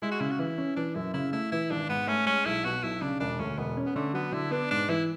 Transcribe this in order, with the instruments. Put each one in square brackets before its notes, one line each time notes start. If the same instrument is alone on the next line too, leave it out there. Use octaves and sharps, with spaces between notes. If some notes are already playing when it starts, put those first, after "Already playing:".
[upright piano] G#3 [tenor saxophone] E4
[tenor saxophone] F#4
[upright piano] C#3 [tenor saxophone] E4
[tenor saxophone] F#4
[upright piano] E3 [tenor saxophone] E4
[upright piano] C#4
[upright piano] E3 [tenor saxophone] D4
[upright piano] F#2 [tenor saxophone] E4
[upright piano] C#3 [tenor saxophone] E4
[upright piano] A3 [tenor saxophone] E4
[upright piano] E3 [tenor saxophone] E4
[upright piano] G#1 [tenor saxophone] D4
[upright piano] G#2 [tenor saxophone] B3
[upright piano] A3 [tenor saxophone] C#4
[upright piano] G#3 [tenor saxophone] C#4
[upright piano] B1 [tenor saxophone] E4
[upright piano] B2 [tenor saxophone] F#4
[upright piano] B1 [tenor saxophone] E4
[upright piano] C#3 [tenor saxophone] D4
[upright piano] E1 [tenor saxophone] D4
[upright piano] D2 [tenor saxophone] C#4
[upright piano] E1 [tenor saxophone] B3
[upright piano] C#4
[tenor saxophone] B3
[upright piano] D3 [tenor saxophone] A3
[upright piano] F#3 [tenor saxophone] B3
[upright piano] D3 [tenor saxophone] E4
[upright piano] B3 [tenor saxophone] D4
[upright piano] G#2 [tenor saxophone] D4
[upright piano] E3 [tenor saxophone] E4